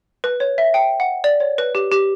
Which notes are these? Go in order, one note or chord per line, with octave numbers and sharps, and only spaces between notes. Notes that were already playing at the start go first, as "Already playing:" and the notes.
B4
C#5
E5
G5
F#5
D5
C#5
B4
G4
G4